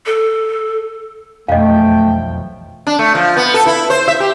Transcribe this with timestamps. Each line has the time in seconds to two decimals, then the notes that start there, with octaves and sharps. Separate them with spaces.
0.06 A4
1.48 E1 B1 F2 A3 D#5 F5 G5
2.87 D4
2.99 A3
3.15 F3
3.37 B3
3.54 A4
3.66 E4
3.90 C5
4.08 E5
4.20 G4